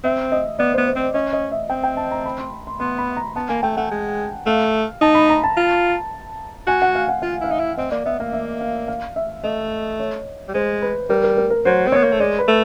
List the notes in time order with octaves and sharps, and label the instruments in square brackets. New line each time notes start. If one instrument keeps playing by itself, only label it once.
[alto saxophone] C4 [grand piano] E5
[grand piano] D#5
[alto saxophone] B3 [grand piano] D5
[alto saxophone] B3 [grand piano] C5
[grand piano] C5
[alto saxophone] C4
[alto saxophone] C#4 [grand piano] D#5
[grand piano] D#5
E5
[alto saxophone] C4 [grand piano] G5
[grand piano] G5
A5
A#5
B5
C6
C6
[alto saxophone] B3 [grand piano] C6
[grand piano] B5
A#5
[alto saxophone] B3 [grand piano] A5
[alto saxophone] A#3 [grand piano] G#5
[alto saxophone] A3 [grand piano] G5
[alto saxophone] A3 [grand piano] F#5
[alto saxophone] G#3
[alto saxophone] A3 [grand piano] F5
[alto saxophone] D#4 [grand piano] A5
[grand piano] B5
A#5
A5
[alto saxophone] F4
[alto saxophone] F#4 [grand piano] G#5
[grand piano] F#5
F5
F#5
[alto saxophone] F4 [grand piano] F5
[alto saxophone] E4 [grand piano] F5
[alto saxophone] D#4 [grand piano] E5
[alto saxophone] E4
[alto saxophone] C4 [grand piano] D#5
[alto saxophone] A#3 [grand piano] D5
[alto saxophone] B3 [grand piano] E5
[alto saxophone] A#3 [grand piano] F5
[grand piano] E5
F5
F5
E5
[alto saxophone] A3 [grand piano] D#5
[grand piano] C#5
[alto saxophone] G3
[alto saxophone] G#3 [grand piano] C5
[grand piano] B4
[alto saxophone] G3 [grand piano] A#4
[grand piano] A#4
A#4
A#4
[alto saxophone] F#3 [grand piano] C5
[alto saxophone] C4
[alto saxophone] B3 [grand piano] C#5
[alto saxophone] A#3
A3
[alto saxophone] G#3 [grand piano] D5
[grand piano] B4
[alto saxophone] A3